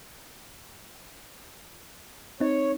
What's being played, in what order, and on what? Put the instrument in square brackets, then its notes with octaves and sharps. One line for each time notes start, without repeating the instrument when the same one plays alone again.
[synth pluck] C4 D#4 [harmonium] C#5